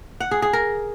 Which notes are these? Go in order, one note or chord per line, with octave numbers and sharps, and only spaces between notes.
F#5
G#4
G#4
A#4